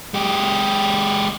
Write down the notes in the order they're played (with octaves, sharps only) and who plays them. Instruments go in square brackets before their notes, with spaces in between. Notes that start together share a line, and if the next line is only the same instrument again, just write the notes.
[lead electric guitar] G#3 G4